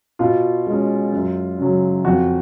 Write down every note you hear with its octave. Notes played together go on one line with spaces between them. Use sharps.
B2 F4
G#3 C#4
F#2
C#3 F#3
F2 F#4